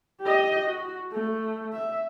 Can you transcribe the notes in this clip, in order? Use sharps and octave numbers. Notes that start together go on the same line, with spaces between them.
G4 D#5
F#4
A3
E5